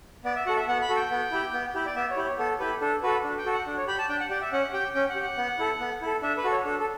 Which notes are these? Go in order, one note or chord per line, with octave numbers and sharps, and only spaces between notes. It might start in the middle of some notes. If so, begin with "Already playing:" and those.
B3 D5
E5
F#4 A4 F#5
E5
B3 F#5
B5
F#4 A4
G5
B3
E4 G4
B3
E4 G4
D5
B3 E5
C#5
E4 G4
C#5
B3 A4
E4 G4 B4
D4 A4
F#4 A4 B4
D4
G5
F#4 A4
F#5
D4
C#5
G4 B5
A5
D4 G5
F#5
G4 D5
E5
C#4 F#5
G4 G5
C#4 G5
F#5
G4
F#5
B3
E4 A4
B3
E4 A4
D4 E5
B4
F#4 A4
C#5
D4 A4
A4